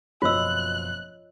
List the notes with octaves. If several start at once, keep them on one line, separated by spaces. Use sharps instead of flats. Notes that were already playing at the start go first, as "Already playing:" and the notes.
F#1 B2 F3 F4 C#5 D#5 E6 F#6